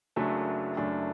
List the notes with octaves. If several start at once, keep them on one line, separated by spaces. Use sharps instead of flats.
F#1 F#2 F#3 A3 D4 E5
F#1 F#2 F#3 A3 D4